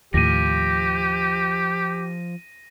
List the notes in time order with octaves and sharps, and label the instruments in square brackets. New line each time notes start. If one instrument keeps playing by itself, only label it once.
[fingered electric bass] D#2 A2 [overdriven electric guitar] F3 [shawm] G4 [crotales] A#6 D#7